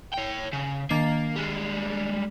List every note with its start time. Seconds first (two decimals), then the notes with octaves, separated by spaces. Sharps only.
0.14 C#5 G5
0.53 C#3
0.90 D#3 A#3 D4 C7
1.36 G3 G#3